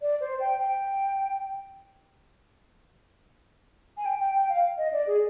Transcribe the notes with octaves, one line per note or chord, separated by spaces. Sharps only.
D5
C5
G5
G5
G#5
G5
G5
G5
F5
D#5
D5
G#4